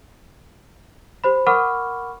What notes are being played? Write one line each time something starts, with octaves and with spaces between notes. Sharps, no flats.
G4 C5 B5
A#4 F#5 B5 C#6 D6 F6